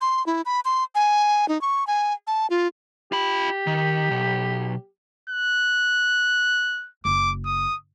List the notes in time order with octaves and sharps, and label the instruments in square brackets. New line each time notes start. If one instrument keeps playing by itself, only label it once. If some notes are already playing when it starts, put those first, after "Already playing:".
[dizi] C6
E4
B5
C6
G#5
D#4
C#6
G#5
A5
F4
[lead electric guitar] F4 B5 [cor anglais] G4
[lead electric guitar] D#3
B1
[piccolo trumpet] F#6
[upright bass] F#1 [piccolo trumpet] D6
[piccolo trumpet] D#6